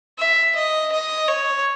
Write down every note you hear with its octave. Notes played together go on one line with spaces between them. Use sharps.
E5
D#5
D#5
C#5